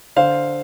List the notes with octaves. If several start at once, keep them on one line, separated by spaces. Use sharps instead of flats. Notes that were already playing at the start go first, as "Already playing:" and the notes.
D3 C5 F5